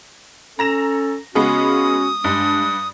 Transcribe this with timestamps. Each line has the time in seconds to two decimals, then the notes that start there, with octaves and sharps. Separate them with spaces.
0.59 C#4 A4 A#5 A#6 E7
1.35 C#3 G#3 B3 C#4 F#4 D#6
2.24 G2 G#3 D4